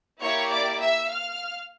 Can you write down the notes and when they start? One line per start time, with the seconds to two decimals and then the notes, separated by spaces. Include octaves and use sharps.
0.20 A#3 E4 G4 C#5 C#6
0.50 D5 D6
0.80 E5 E6
1.10 F5 F6